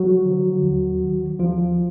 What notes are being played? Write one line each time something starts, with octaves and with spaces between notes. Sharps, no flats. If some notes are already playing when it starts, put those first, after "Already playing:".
Already playing: F#3 F#4
D3 F3
D#2
D#3 F#3
D#2 F3 F4